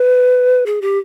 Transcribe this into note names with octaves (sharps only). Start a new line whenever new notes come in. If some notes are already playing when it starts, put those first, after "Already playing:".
Already playing: B4
G#4
G4